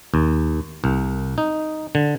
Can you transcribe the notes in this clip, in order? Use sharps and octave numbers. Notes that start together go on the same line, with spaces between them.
D#2
C2
D#4
D3